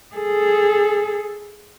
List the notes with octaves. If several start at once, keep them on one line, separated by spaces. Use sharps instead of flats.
G#4 A4